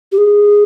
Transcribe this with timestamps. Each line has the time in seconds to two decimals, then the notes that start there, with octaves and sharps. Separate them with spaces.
0.12 G4
0.18 G#4